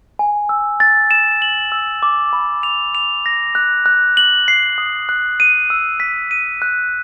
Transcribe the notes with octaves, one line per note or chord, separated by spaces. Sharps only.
G#5
E6
A6
E7
F#7
E6
D6
B5
F7
F7
A#6
F#6
F#6
F#7
C7
D#6
F#6
D#7
E6
B6
D#7
F#6